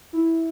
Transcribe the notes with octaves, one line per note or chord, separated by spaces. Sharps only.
E4